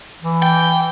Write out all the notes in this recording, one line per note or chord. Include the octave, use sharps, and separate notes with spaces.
E3
G5